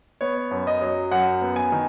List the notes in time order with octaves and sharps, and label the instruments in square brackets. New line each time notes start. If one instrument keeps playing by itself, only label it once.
[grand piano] B3 C#5
F#2
D#5
F#3
F#2 F#5
B3
G#5
D#3